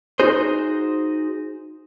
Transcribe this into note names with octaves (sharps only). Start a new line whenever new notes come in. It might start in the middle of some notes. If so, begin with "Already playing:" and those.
D#4 F#4 G#4 C5